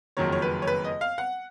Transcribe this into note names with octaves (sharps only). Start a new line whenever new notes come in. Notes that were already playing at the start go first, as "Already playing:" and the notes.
F#1 F2 D#3 F#3 C#5
C#5
B4
C#5
B4
D#5
F5
F#5